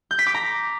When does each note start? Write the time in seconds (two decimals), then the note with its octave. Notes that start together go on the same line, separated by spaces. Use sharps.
0.11 G6
0.19 B6
0.27 D6
0.34 A#5